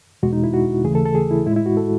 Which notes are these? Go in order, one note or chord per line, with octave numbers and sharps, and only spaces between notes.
E2 B2 G#3 F#4
D#4
E4
F#4
D#2 C#3 E3 A3 G#4
A4
A4
G#4
E4
A2 G#3 E4
E4
F#4
A4